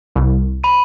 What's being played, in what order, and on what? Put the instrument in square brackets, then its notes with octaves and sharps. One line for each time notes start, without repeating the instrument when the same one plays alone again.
[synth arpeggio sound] C2
[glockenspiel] B5 D#7